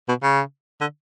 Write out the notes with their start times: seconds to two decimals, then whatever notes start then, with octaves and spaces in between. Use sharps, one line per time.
0.09 B2
0.23 C#3
0.81 D3